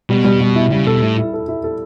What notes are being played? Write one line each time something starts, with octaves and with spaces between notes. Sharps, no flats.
B2 G3
G3
G3
E4
C#3 G3
B2 A4
A2 E4
E4
A4
E4
A4